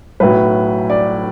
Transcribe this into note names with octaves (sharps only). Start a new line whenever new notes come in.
B1 A2 F#3 B4
D5